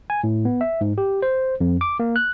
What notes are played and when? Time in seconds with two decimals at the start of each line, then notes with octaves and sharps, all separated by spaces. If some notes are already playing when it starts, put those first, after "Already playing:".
0.10 G#5
0.24 A2
0.45 B3
0.61 E5
0.81 G#2
0.98 G4
1.22 C5
1.61 F2
1.81 D6
2.00 A#3
2.16 F#6